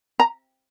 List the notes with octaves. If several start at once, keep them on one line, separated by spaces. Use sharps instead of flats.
A#5